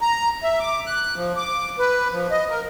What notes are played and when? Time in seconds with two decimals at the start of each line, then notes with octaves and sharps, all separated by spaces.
0.01 A#5
0.43 E5
0.60 D6
0.86 F#6
1.16 F3
1.37 D6
1.79 B4
2.12 F3
2.31 D#5
2.49 A#4